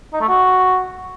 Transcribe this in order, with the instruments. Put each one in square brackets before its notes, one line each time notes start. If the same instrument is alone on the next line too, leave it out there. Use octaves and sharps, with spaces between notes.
[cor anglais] D#4
A3
F#4